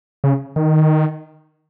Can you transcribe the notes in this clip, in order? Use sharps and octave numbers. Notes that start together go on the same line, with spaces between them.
C#3
D#3